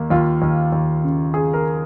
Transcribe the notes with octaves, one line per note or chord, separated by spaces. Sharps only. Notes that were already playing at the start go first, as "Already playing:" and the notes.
Already playing: D#2 A#3
D#2 F4
D#2
D#2
C#3
C#3 G#4
A#4